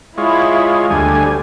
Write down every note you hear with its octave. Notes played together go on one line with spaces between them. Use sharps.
G#3 E4 F4 C#5
D2 D3 G3 G#5